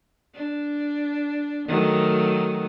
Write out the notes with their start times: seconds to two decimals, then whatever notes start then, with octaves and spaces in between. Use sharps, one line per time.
0.35 D4
1.68 D#3 F#3 A3